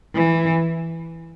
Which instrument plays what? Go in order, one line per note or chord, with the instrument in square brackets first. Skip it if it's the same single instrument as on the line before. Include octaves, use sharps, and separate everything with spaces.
[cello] E3